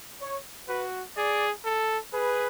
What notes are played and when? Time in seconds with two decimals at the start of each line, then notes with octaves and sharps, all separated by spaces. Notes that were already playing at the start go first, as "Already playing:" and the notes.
0.21 C#5
0.68 F#4 B4
1.17 G#4 D5
1.64 A4
2.13 G#4 B4